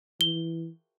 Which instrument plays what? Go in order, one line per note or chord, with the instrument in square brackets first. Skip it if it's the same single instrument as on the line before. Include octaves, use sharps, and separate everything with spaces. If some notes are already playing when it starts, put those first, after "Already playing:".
[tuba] E3 [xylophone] G7